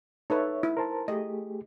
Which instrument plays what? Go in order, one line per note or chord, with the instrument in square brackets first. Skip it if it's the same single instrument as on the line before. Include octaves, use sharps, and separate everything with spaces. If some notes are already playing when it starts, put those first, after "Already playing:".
[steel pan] D#4 A4 B4 [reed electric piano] C#5 E5
[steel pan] E4
[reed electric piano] A#4 C5 A5
[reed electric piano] A3 G4 G#4 [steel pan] D#5